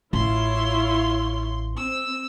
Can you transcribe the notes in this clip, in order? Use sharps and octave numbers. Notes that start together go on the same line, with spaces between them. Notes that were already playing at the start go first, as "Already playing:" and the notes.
A1 E4 F4 C#5 C6
C4 E6